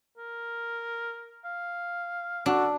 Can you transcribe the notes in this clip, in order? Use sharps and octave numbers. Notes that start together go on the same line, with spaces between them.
A#4
F5
D4 F#4 A4